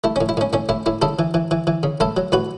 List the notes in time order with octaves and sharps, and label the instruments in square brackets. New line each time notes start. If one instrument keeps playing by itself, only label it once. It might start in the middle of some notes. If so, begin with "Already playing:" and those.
[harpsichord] A3 E4
A2 C#4
E4
A2 C#4
A2 C#4
A2 E4
A2 E4
C#3 E4 A4
E3
E3
E3
E3
C#3
A2 E4 A4
F#3
A2 F#4 B4